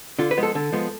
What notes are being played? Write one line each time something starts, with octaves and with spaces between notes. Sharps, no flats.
D3 F4
B4
F3 G#3 B3
A4
D3 A4
F3 G#3 B3